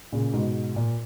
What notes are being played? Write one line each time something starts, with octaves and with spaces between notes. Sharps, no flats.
A#2 C#3
G#2 B2
A#2